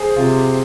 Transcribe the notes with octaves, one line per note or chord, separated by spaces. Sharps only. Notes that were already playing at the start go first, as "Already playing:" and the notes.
Already playing: G#4 C5
C3 F4